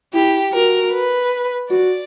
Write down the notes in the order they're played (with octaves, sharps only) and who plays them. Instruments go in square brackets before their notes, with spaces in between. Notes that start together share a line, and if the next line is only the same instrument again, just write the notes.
[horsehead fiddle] E4 [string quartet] G4
[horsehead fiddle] F#4 [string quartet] A#4
[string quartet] B4
[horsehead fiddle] F#4 [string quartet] D5